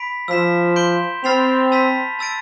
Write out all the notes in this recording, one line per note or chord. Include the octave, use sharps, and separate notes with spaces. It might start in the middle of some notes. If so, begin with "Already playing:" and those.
Already playing: B5 B6 D7
F3 E6 B6 E7
C6 G6 D7 G7
C4 B5 F6 A6 C7 F7
A5 E6 B6
A5 E6 A6 D7